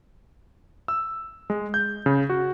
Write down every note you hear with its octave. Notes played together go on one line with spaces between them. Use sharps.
E6
G#3
G6
C#3
F#4